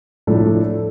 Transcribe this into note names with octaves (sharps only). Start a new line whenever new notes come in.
A2 F3 A3 D4 A4